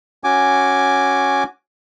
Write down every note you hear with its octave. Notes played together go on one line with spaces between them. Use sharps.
C#4 F#4 G#5 D6